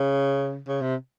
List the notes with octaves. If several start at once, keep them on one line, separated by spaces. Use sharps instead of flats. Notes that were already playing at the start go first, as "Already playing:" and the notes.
Already playing: C#3
C#3
C3